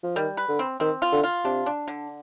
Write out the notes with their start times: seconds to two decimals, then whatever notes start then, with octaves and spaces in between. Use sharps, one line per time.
0.03 F3
0.16 D#3 G3
0.37 B4
0.49 D3
0.59 C4
0.80 D#3 C4
1.02 F4
1.12 D3
1.24 F4
1.45 C3 D4
1.66 D4
1.88 D3